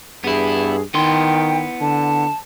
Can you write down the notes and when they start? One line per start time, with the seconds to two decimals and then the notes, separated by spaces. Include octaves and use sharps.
0.24 G2 B3 E4 G#4
0.94 D#3 B3 E4 G5 C6
1.81 D3 A5